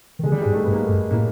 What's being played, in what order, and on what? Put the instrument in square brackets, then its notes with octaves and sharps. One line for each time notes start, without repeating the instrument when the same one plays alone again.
[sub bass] D#3
[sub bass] D3 [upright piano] G#3
[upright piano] G3
G#3
[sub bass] G#2
[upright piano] A3
[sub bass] G#2 [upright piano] B3
[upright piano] A#3
A3
[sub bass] G2
[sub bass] A2 [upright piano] A#3